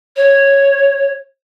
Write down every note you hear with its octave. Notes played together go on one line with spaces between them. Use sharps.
C#5